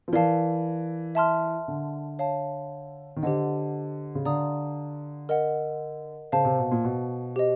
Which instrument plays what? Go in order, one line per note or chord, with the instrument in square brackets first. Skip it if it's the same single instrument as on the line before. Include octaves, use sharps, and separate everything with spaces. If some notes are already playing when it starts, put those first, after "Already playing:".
[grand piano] F3
[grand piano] E3 [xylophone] A#4 D5 F5 A5
[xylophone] E5 A5 C6 F6
[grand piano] D3
[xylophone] C#5 F5 A5
[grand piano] D#3
[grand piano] D3 [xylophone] G4 C5 D#5 F#5
[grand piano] C#3
[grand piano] D3 [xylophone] D5 F5 A#5 D#6
[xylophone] A#4 D#5 F#5
[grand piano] C#3 [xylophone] C5 F5 A5
[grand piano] C3
B2
A#2
B2
[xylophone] G4 C5 D#5